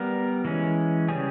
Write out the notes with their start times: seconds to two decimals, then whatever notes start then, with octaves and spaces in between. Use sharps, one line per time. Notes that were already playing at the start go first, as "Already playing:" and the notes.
Already playing: G3 B3 A#4
0.45 E3 G#3 C#4
1.08 C#3 G3 C#4 G#4